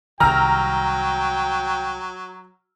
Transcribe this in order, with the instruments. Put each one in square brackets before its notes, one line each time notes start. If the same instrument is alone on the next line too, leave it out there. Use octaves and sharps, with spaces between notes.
[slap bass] C2 D#3 [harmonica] F#3 [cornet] G5 [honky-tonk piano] A#5 E6 F6